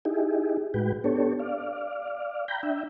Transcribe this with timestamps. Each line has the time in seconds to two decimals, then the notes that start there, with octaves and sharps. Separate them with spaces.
0.05 D#4 E4 G4 G#4
0.74 A2 G#3 F#4 B4 G5
1.04 B3 D4 G4 A4 C#5
1.39 D5 F5
2.48 G5 A#5 B5 G6
2.63 D4 E5 G5